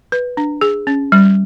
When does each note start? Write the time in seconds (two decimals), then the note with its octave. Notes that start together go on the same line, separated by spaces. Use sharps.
0.12 B4
0.37 D4
0.61 G#4
0.87 C#4
1.12 G3